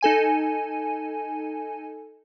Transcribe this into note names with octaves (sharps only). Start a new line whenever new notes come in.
D#4 A4 G#5 D#7